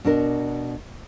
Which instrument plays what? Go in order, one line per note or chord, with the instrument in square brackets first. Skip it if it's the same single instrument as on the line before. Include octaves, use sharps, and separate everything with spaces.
[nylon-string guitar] B2 D4 A#4